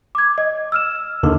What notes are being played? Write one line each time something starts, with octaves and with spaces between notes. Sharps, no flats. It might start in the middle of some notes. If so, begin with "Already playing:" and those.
D6 G#6
D#5
E6 F6 E7
D#2 D3 D#3